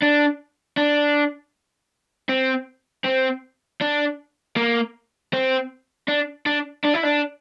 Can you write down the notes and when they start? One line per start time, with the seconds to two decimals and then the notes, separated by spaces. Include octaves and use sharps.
0.02 D4
0.77 D4
2.29 C4
3.05 C4
3.82 D4
4.57 A#3
5.33 C4
6.08 D4
6.46 D4
6.85 D4
6.95 E4
7.04 D4